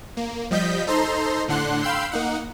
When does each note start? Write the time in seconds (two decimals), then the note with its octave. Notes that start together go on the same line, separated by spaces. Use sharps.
0.17 A#3
0.51 F3 G3 D#5 G6 B6
0.87 D#4 A4 C5 A#5 C6
1.48 A2 D3 D4 F#5 C6 F#6
1.82 F5 G5 B5 C6 E6 G6
2.12 A#3 D#4 F#5